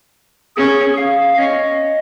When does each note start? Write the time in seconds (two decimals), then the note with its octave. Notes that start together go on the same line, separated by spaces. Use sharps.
0.57 C#4 G#4
0.97 F5
1.38 C#4 D#5